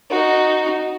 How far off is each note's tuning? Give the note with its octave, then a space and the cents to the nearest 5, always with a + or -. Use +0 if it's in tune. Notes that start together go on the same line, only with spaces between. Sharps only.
D#4 -5 F#4 +0